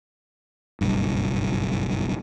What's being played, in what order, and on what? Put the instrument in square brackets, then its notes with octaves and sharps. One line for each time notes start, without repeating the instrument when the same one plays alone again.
[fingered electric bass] F#1 B1 G2